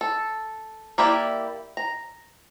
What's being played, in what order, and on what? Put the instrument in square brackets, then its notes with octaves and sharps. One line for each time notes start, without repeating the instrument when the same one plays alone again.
[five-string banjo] A4
A#3 E4 G4 D5
A#5